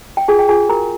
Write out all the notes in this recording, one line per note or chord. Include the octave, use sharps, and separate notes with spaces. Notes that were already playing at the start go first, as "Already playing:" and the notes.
G5
F4 G#4 G#5
G5
F4 G#4 G#5
F#4 A#4 A#5